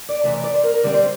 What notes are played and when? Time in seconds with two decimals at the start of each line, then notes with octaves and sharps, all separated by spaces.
0.09 D5
0.24 C3 E3 A3 E5
0.33 D5
0.44 D5
0.54 C5
0.63 A#4
0.74 A#4
0.83 D3 G3 C4 D5
0.94 C5